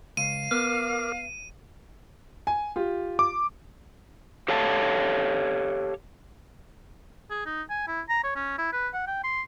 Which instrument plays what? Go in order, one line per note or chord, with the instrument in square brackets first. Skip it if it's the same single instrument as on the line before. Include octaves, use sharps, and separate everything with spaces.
[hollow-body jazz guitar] C#2 [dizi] F5 [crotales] D#7
[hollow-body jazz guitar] B3 [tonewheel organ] A#4 D6 F6
[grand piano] G#5
F4 G4
[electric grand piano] D6
[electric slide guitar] G4 A4 C#5 F5 A5
[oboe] G#4
D#4
G#5
E4
A#5
C#5
C#4
E4
B4
F#5
G5
C6